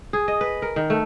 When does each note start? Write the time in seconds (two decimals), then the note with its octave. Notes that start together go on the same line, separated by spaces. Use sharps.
0.13 G#4
0.28 D#5
0.41 B4
0.62 A#4
0.76 D#3
0.90 A3